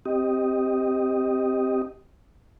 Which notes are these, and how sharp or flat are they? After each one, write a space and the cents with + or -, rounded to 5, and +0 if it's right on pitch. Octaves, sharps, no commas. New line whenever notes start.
C4 +0 G4 +0 D#5 +0